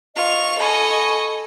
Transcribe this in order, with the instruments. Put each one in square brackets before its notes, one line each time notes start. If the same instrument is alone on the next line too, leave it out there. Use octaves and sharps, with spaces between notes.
[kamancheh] F4 [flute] D#5 [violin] C#6 F7
[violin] A4 D#5 [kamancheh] G#5 C#6 [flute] B5